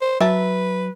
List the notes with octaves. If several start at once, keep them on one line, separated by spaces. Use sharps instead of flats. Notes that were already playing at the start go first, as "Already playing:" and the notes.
C5
F#3 B4 E5 A5